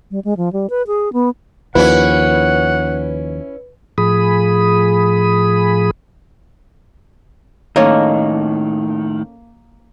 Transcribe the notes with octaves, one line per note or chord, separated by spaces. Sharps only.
G3
G#3
F3
G3
B4
G#4
B3
D#2 F3 C#4 E4 B4 F#5
A2 F3 G#4 B5 D#6
A2 D#3 A#3 C#4 A4 C#5 D#5